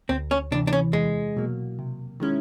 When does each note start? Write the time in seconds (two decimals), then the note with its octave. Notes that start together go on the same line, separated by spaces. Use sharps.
0.09 D2 C4
0.31 C#4
0.51 C3 E3 D4
0.67 D4
0.73 C#4
0.93 E2 G#3
1.37 B2 F#3 A#3
1.79 C3
2.20 D#3 G#3 C#4 E4